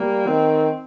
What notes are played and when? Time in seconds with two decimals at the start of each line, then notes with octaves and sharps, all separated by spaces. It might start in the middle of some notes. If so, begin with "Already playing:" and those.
Already playing: G3 A#3
0.26 D#3 C4